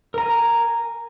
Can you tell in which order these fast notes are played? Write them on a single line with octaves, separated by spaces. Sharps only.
A#4 A#5 G#5